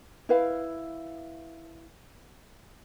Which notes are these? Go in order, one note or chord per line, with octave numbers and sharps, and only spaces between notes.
E4 B4 F5